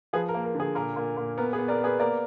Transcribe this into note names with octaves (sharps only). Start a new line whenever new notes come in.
F3 G#4 B4
A#4
A#3
A#4
D3
G#4
A#2 A#4
A#2
A#2
B3 A#4
G#4 B4
B3
A#4 D5
B3
G#4 B4
A#3 A#4 D5